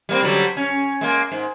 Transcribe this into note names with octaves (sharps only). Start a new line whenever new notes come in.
G3 A#3 C4
D3 F#3 G3
C#4
G#3 A#3
G#2